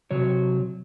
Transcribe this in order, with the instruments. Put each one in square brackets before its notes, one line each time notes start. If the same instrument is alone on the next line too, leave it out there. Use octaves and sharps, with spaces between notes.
[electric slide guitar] C3 F#3 C#5